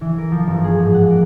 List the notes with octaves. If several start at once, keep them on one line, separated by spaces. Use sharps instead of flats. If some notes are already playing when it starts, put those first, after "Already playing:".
E3
A#4
F3
G1
G#4
G#2
F#5
A#3